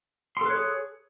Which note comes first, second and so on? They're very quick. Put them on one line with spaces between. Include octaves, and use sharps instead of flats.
C6 A4 B4 C#5 G#4